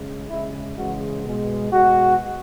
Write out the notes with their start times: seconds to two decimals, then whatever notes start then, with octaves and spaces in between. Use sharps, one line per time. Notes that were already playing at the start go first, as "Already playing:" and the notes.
Already playing: C#3 G#3
0.29 C#3 G#3 E4
0.77 C#3 E3 G#3 F#4
1.24 B2 G#3
1.71 B2 G#3 F#4